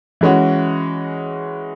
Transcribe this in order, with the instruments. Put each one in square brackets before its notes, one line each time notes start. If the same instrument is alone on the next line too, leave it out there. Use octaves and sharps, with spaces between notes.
[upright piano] E3 G#3 C#4 F#4